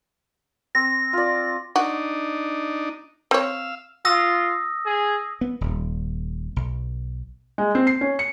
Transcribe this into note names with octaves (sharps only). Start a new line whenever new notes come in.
C4 A#6
F4 D5
D4 D#4 F#4
C4 C#5 F5 E6
F4 D#6 E6 A#6
G#4
B3
D#1
B1
G#3
C4
C7
C#4
C#7